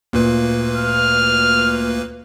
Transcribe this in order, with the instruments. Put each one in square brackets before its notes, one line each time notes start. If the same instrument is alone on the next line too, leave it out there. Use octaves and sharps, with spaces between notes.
[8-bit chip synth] D2 A#3 B4 [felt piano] A#2
[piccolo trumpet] F6